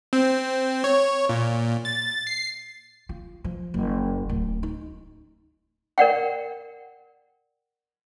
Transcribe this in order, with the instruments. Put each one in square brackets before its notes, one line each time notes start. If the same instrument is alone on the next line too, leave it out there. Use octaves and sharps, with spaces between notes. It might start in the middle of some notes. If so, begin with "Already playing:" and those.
[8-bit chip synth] C4
C#5
A#2
A6
C7
[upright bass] F4
F3
F#1
D1
D#4
[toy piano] A#4 D5 F#5 G5